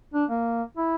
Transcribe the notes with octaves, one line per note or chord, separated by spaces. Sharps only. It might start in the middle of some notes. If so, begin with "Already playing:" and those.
D4
A#3
E4